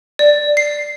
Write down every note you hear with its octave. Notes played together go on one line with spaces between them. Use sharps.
D5
C7